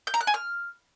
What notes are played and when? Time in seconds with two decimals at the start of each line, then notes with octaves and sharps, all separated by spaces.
0.07 G6
0.14 A#5
0.21 F#6
0.27 G#5
0.34 F6